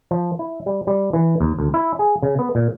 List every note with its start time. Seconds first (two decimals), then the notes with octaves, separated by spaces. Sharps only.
0.11 F3
0.39 E4
0.66 G3
0.87 G3
1.13 E3
1.40 D#2
1.59 D2
1.74 E4
1.99 G#4
2.22 C#3
2.39 B3
2.55 A#2